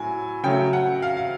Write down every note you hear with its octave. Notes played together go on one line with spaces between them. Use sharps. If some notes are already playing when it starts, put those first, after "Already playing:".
Already playing: A2 F#3 G#5
C#3 F#3 A3 G5
F#5
F5
F5